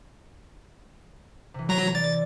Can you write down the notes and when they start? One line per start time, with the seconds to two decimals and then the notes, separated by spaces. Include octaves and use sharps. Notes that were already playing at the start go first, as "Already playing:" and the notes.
1.54 C3 E3
1.69 F#3 A#5
1.95 D5 A6